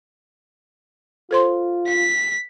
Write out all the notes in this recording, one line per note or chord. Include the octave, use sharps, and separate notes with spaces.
F4 A4 C5 C6
F5 B6